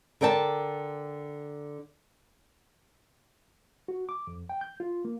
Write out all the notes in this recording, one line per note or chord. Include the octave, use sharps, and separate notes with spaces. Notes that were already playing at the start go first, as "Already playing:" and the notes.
D3 A#4 D5 G5 A5
F#4
D6
F2
G5
G6
F4
A#3